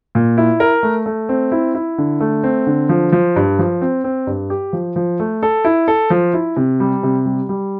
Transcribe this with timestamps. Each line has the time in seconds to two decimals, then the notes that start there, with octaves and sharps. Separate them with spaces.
0.15 A#2
0.38 E4
0.60 A#4
0.83 A3
1.06 A3
1.29 C4
1.52 E4
1.75 E4
1.98 D3
2.20 A3
2.44 C4
2.67 D3
2.89 F3
3.12 F3
3.36 G2
3.59 F3
3.82 C4
4.04 C4
4.27 G2
4.50 G4
4.73 F3
4.96 F3
5.20 A3
5.43 A4
5.65 E4
5.88 A4
6.10 F3
6.34 E4
6.56 C3
6.80 G3
7.03 C3
7.25 G3
7.49 G3